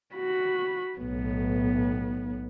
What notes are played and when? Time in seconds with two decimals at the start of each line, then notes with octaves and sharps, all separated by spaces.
0.15 F#4 B5
0.98 B1 A2 B3